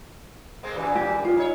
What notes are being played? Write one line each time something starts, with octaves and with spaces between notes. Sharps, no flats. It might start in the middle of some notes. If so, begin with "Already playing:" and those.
G#3 A#3 C4
F#2 A#2 E3
G4
F4
D#4 C#5